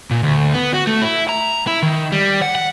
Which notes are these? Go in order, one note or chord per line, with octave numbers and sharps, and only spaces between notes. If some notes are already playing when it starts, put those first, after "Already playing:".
A#2
D2
B3
F#4
A3
E4
A#5
E4
D#3
G3
F#5
F#5